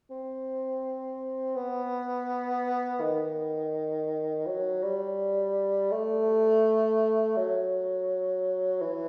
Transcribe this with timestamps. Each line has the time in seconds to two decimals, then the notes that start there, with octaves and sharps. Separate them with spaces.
0.10 C4
1.56 B3
3.01 D#3
4.47 F#3
4.83 G3
5.92 A3
7.36 F#3
8.82 E3